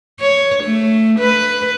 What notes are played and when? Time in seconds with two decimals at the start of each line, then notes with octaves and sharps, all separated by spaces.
0.20 C#5
0.64 A3
1.19 B4